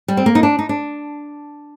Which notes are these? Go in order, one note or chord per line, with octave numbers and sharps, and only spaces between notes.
G3
C4
A#3
D#4
D4
D#4
D4